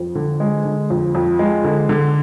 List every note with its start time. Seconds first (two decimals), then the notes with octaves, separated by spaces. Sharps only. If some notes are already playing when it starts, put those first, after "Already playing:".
Already playing: F2
0.15 D3
0.40 G#3
0.65 D3
0.90 F2
1.15 F2
1.39 G#3
1.64 D3
1.89 D3